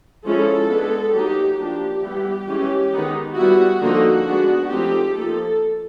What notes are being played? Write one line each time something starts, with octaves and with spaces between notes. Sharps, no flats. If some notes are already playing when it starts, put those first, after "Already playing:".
F3 G#3 C#4 E4 A4
G#3 B3 D4
F#3 A#3 D#4 G4
F3 A#3 D4 G4
E3 G3 B3
E3 G#3 C#4
D#3 G#3 B3 D#4
G3 B3 E4 F#4
D3 F3 A#3 D#4 F#4
G#3 B3 D4
F3 A3 C4 D#4 G4
F3 A#3 D#4 A4